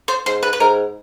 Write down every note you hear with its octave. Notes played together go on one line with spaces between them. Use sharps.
C5
G#2 C5
B4
B4
G#2 A#4